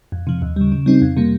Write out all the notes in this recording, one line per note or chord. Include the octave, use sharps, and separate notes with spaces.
F2
C3 F3
D#2
C#3 G3
C#3
G3 C4 D#4
F2
C3 G3 A#3